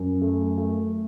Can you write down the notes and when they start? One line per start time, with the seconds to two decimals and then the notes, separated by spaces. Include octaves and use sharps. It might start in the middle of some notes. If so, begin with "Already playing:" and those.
Already playing: F#2
0.22 A3
0.58 A3